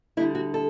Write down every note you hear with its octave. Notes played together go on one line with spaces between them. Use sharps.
D2 D3 G3 E4
F#4
A4